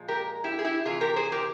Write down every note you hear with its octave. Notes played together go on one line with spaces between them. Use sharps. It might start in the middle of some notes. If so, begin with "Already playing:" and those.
Already playing: A#2 F3 G#3
G4 A#4
E4 G4
G#4
E4 G4
C3 E3 F4 G#4
G4 A#4
G#4 C5
G4 A#4